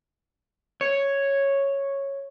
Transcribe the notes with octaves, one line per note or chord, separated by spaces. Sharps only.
C#5